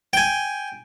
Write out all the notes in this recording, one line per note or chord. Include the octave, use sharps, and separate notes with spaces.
G5 G#5